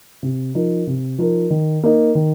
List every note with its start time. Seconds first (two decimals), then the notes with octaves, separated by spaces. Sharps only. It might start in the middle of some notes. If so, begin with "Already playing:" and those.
0.23 C3
0.55 F3 D#4 A#4
0.87 C3
1.18 F3 D#4 A#4
1.50 D#3
1.83 A#3 D#4
2.15 D#3